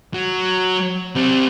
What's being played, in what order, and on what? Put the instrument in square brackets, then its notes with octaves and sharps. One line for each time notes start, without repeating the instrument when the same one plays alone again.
[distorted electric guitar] F#3
G3 C4